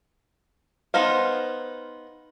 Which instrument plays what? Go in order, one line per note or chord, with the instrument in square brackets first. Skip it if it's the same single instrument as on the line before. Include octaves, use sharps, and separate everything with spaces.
[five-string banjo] B3 D#4 C5 F5